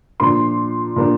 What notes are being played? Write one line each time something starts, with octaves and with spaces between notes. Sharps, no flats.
A#2 F3 A#3 D4 C6
A#2 F3 A#3 D4